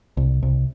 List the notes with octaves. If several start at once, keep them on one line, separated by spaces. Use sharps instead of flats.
C2
C2